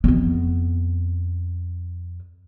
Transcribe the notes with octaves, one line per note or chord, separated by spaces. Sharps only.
F2 B3